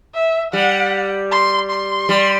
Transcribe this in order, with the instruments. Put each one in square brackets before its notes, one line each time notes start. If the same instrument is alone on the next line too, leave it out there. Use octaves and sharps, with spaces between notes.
[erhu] E5
[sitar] G3 [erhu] F#5
[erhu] C6
C6
[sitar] G3